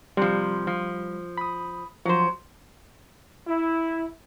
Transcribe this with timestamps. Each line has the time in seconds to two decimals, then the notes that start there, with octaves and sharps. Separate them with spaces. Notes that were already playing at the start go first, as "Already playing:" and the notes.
0.17 C3 F3 G3
0.67 F3
1.38 B5 D#6
2.05 F3 F#3 C5
3.46 E4